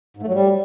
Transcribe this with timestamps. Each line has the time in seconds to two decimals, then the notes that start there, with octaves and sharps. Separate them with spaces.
0.17 G#2
0.22 A3
0.28 F#3
0.34 G3